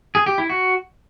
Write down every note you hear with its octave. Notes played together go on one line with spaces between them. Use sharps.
G#4
G4
E4
F#4